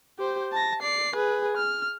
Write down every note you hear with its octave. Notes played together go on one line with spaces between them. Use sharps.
G4 C5
A5 A#6
D5 C7
G#4 B4
F6